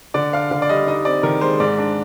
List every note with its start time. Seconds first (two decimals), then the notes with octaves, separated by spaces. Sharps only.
0.14 D3 D5
0.33 D4 F5
0.51 D3 F5
0.62 D5
0.69 G3 D#5
0.87 D#4 D#5
1.05 C4 D5
1.23 D#3 A#4
1.41 G#3 C5
1.60 G#2 D5
1.78 D4